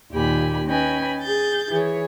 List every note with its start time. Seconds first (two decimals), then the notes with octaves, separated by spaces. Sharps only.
0.12 D#2 A#2 G4 G#5 B5
0.67 C#4 B4 D#5 G5 G#5 B5
1.21 G#4 G6 A6
1.70 E3 G#4 C#5